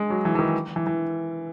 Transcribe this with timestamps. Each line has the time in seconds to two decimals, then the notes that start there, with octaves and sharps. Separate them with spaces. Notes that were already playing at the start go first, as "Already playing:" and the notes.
Already playing: G#3
0.10 F#3
0.25 E3
0.35 E3
0.39 D#3
0.76 E3
0.87 E3